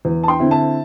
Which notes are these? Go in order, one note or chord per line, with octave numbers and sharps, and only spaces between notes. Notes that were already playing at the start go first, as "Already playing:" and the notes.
E2
A5
G5 C6
D3 C4 E4
E5 A5